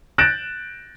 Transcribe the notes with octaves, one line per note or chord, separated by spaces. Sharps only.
F#6 G6 A6 A#6 D7 E7